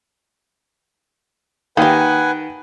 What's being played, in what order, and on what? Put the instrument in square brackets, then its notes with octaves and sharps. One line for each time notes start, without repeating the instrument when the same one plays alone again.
[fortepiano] D#3 [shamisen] A#3 G4 [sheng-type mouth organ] B4 F#5 G#5